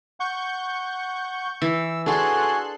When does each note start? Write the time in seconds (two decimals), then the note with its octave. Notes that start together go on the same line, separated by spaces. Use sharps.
0.20 F#5 C#6 G6
1.62 E3 E6
2.06 D4 F#4 G#4 A4 G#5 C6 F#6